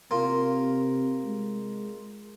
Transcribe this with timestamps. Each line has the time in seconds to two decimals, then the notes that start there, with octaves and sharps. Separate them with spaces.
0.11 C3 A#3 F4
1.25 G#3